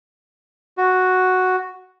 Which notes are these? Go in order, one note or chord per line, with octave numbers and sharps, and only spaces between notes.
F#4